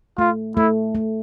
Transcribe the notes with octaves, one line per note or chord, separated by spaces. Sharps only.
A3 F4
A3 E4
A3